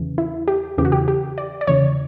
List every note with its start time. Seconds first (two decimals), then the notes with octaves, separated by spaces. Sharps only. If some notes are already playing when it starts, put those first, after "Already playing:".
Already playing: E2 C#3 E3
0.18 E4
0.48 G4
0.78 E2 C#3 E3 G4
0.85 F#4
0.92 G4
1.08 G4
1.38 D5
1.61 D5
1.67 E2 C#3 E3 C#5